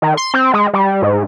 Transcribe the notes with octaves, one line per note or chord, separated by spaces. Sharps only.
D#3
C6
C4
G#3
G3
G#2